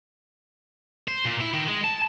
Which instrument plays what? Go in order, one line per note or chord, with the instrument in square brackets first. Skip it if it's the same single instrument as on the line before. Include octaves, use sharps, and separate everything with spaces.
[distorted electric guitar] C5
A#2
E4
D#3
G#3
A5